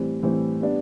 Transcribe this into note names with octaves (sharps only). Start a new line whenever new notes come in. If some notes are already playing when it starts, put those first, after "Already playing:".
Already playing: A2 E3 G3 C4
A2 E3 G3 C4
G3 B3 D4